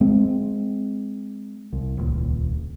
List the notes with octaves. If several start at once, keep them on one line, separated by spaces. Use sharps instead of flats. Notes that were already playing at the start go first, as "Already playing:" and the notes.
G#3 C4
C2
D#1 C#2 A#2